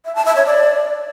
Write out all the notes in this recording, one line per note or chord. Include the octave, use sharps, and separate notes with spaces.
E5
A5
E5
C#5
D5